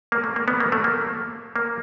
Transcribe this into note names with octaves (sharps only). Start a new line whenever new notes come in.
A#3
A3
A#3
B3
A#3
A3
A#3
A#3